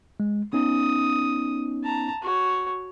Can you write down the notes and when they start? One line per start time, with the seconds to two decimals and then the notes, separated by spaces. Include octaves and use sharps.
0.20 G#3
0.53 B3 C#4 D#4 D#6
1.84 A5 A#5
2.22 F#4 C#5